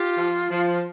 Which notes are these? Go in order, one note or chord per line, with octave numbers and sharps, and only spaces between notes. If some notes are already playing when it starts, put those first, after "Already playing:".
Already playing: F4 G4
F3
F3